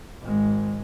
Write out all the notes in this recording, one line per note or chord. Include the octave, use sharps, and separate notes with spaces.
G#1 G#3